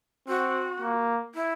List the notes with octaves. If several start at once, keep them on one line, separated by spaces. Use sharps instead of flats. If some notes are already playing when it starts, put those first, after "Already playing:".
C4 F#4
A#3
E4